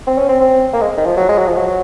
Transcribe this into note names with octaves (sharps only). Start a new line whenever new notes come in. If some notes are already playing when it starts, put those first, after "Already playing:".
C4
C#4
C4
C4
A#3
G#3
D#3
F3
F#3
G#3
F#3
F3
F#3